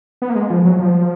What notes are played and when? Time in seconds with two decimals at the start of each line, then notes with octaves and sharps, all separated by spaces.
0.22 B3
0.30 A#3
0.36 G#3
0.50 F3
0.65 F#3
0.80 F3